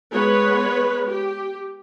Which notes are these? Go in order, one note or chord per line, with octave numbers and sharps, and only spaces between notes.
G#3 B3 B4 C#5
G4